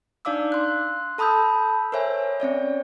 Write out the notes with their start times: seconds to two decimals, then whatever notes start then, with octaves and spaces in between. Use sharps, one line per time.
0.25 D4 D#4 D5 F5 D6 E6
0.52 C6 F#6
1.18 A4 A5 B5 D#6 E6 G6
1.92 A#4 C5 C#5 E5 G#5
2.40 C4 C#4 C#5 D5